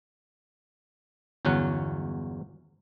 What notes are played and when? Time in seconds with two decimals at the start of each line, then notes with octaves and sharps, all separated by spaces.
1.45 G1 E2 F#3 C#4 F#5